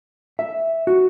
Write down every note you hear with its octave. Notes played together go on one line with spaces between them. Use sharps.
E5
F#4